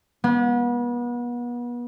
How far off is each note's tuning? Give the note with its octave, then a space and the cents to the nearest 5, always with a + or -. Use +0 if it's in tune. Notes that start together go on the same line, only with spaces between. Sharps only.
B3 -35